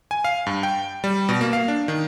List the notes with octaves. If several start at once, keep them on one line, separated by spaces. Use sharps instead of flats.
G#5
F5
G2
G5
G3
B2
A#3
F5
D4
D#3